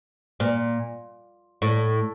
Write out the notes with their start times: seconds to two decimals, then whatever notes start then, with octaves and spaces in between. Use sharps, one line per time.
0.40 A#2
1.62 A2